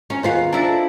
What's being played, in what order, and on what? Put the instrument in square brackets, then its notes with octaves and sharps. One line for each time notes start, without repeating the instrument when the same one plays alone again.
[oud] C#4 [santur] C#5 A#5
[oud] D#2 B3 F5 [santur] F4 G#4 C5
[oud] D4 E4 [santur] D#5 A#5
[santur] A4